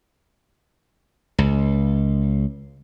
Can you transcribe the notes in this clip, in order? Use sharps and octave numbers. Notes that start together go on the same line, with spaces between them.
C#2